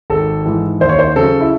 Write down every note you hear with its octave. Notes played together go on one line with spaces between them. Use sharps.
G#1 A4
G#2 E3
D#2 C5
C#5
C5
C#3 F#3 A4
E4